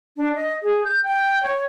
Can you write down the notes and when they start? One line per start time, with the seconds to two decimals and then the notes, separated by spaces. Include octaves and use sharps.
0.17 D4
0.35 D#5
0.63 G#4
0.84 G6
1.04 G5
1.43 C#5